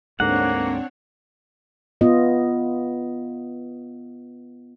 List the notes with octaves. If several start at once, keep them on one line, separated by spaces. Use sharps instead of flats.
D2 G#2 D3 A#3 C4 D4 C#5 F#5
B3 F4 D#5